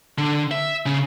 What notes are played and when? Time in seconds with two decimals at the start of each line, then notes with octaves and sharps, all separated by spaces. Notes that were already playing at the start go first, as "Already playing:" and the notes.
0.18 D3
0.51 E5
0.86 C#3